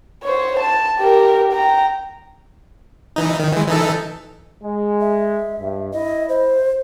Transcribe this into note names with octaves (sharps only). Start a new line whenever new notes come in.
C5 C#5
A5
G4 A#4
G5 A#5
E3 D#4
D#3
E3 G#3
E3 D#4 A4
G#3
E5
G2
E4 D#5
C5